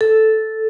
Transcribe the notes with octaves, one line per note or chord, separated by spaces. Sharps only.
A4